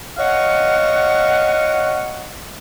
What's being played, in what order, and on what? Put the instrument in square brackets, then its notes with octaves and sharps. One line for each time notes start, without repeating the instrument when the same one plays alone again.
[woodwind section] C#5 D#5 F5 F#5